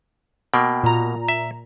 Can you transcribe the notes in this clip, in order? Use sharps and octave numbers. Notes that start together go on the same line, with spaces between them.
B2 A#3 G5
A#2 A#5
E5